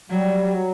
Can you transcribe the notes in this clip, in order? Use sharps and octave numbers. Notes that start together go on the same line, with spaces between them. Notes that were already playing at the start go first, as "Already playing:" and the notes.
F#3 G3
F#3